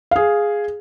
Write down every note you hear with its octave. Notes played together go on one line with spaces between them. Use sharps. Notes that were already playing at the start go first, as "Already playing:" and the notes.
G#4 F5